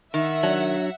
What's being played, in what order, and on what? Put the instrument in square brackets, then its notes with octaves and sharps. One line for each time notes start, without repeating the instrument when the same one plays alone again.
[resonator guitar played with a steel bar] D#3 [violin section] E5 F#5
[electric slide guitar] F#3 [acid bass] D4